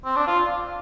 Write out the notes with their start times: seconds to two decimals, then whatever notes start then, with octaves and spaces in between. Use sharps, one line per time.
0.05 C4
0.16 D4
0.27 F4